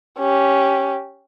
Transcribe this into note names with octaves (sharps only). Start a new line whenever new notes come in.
C#4 G4